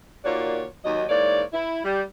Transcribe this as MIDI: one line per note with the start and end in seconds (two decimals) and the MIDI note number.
0.25 0.65 39
0.25 0.65 46
0.25 0.65 58
0.25 0.65 66
0.25 0.65 73
0.25 0.65 74
0.85 1.03 39
0.85 1.03 54
0.85 1.03 75
1.09 1.43 44
1.09 1.43 52
1.09 1.43 58
1.09 1.43 73
1.09 1.43 74
1.53 1.80 64
1.84 2.02 55